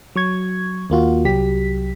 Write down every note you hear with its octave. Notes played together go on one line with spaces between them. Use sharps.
F#3 C#6 G#6
D#2 A#3 F4 F#4
C2 F#3 G4 B6